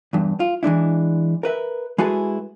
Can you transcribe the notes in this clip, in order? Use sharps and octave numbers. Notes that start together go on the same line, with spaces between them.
E2 G2
F4
E3 G#3 D4 E4
A#4 B4 E5
G#3 E4 F#4 G#4 A4 B4